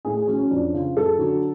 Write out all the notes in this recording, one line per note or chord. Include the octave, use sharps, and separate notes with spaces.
A2 G#4
G#4
F#3 C#4
C#4
F2 D4
C#3 F3 F4
F#2 A4
D3 F#3